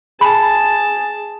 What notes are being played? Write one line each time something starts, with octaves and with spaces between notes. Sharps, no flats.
G#4 A5 B5